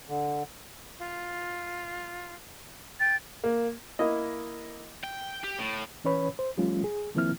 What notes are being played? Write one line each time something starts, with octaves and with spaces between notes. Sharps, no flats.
D3
F4
G5 A6
A#3
A#3 E4 D#5
G5
G4
A2
E3 C#4 B4 C#5 B5
C5
F3 G3 A3 C#4 F4
G#4
D#3 F3 A#3 C4 E4 F6